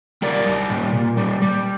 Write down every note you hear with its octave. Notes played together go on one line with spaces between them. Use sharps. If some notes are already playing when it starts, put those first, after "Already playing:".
G3 A#4 D5
G3
A#2
A#2
G3
G3